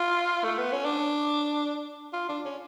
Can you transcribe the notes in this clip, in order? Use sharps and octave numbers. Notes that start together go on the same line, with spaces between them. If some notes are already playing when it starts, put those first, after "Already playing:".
Already playing: F4
A3
B3
C#4
D4
F4
D4
C#4